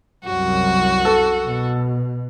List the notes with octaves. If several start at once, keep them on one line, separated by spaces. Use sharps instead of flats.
C2 F#2 F#4
A4
B2